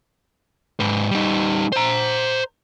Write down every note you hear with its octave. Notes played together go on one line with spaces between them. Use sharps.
G#2 B4
G3 D#4
C5 A#5